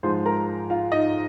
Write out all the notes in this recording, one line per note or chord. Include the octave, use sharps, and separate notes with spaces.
G#2 F3 G#3 C5 C6
A#4 A#5
F4 F5
D#4 D#5